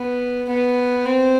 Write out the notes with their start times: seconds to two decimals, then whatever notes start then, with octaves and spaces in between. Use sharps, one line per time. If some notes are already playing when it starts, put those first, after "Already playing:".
Already playing: B3
0.49 B3
1.05 C4